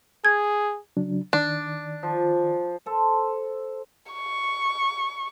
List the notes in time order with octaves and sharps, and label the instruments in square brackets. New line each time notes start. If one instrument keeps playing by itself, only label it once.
[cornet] G#4 [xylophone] G#6
[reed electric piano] C#3 F#3 D4
[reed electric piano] D#3 D5 [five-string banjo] D4
[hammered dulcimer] F3
A4 C5
[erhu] C#6